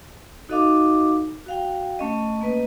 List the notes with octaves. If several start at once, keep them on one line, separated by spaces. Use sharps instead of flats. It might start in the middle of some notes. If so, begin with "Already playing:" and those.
D#4 F#4 A4 D#5 F5 D6
F#4 F5 G5
A3 C#4 D#5
A#3 B4 D#5